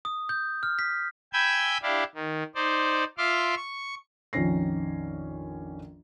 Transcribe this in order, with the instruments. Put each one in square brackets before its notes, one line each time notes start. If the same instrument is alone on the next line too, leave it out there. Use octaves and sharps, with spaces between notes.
[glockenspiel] D#6
G6
F6
B6
[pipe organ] G5 G#5 B5 E6 G6 G#6
D4 E4 G4 D5 F5
D#3
D#4 C5 D5
F4 E5 C6 D6 F6
C#6
[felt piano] A#1 F2 D#3 C#4 A#6 C7